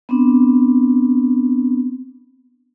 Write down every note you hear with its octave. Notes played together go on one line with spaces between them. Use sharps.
B3 C4 D4